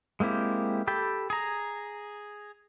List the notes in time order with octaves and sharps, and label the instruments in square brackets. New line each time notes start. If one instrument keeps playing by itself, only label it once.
[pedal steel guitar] G#3 A#3 C4 E4 G4
G4 A4 G5 B5
G#4 A#5